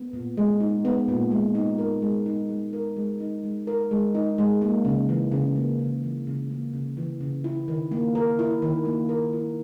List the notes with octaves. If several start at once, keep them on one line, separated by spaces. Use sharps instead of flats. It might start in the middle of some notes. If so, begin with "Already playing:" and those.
Already playing: B3
A#2
G#3
D#4
B3
A#2
G#3
D#4
A#4
G#3
D#4
G#3
A#4
G#3
D#4
G#3
A#4
G#3
D#4
G#3
A#3
C#3
E3
C#3
A#3
C#3
E3
C#3
A#3
C#3
E3
C#3
E4
D#3
A#3
A#4
E4
D#3
A#3
A#4
E4